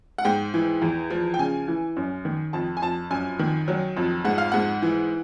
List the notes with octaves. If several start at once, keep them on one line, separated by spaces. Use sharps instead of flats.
F#5
G#2 G5
E3
E2
F3
G5
C#3 G#5
E3
F#2
D#3
F2 A5
G#5
F2 A5
F#2 G#5
D#3
F#3
F2
G#2 F#5
F5
G#2 F#5
E3